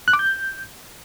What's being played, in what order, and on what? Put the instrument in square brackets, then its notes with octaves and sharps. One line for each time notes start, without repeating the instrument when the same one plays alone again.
[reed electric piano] F#6
D6
G6